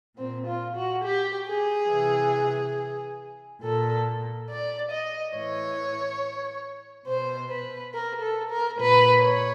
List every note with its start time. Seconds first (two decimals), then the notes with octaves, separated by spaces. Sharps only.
0.17 A#2 C4
0.46 F4
0.75 F#4
1.03 G4
1.47 G#4
1.90 C3 E3
3.62 A#2 A4
4.48 D5
4.91 D#5
5.34 A2 E3 C#5
7.06 B2 C5
7.49 B4
7.93 A#4
8.21 A4
8.50 A#4
8.78 A#2 B4
9.21 C#5